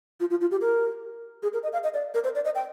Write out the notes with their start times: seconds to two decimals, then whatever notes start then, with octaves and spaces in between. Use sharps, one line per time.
0.20 F4
0.30 F4
0.41 F4
0.51 G4
0.61 A#4
1.43 G#4
1.53 A#4
1.63 D#5
1.73 F5
1.84 D#5
1.94 D5
2.14 A#4
2.24 C5
2.35 D5
2.45 D#5
2.55 G5